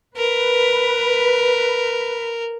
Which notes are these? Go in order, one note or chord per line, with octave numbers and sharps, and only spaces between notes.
A#4 B4